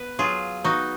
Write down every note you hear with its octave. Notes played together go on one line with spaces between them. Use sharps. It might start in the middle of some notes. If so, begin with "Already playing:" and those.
Already playing: B3 B4
F#3 F4 G#4
B3 D#4 F#4